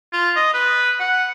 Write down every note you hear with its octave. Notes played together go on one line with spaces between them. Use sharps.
F4
D#5
B4
F#5